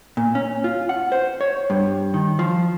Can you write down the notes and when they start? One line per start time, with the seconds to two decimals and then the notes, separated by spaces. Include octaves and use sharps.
0.17 A#2
0.35 C#4
0.64 F4
0.89 F#5
1.12 C5
1.41 C#5
1.70 G2
2.14 D#3
2.39 F3